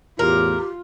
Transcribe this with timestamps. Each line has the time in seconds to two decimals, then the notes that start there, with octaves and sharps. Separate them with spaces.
0.19 E2 A2 F4 G4 A#4